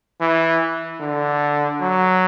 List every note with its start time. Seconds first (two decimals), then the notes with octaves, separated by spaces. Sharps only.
0.21 E3
1.00 D3
1.81 F#3